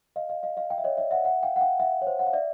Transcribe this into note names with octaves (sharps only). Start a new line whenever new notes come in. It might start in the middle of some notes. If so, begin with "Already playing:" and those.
D#5 F5
D#5 F5
D#5 F5
D#5 F5
F5 G5
E5
C#5 D#5
D5 E5
E5 F#5
E5 F#5
F5 G5
F#5
F5 G5
E5 F#5
C#5
C5
F#5
F5
D5 E5